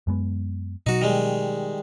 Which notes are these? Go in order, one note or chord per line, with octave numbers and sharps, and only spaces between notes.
F#2 G#3 B3
B2 F#3 D#4 F#4
D#3 G3 G#3